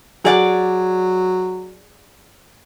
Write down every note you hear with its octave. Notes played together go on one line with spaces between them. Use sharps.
F#3 G#4 D5 F#5